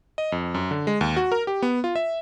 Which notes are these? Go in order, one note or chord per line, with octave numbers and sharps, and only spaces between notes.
D#5
F2
F#2
D3
G#3
D#2
F#4
A#4
G4
B3
F4
E5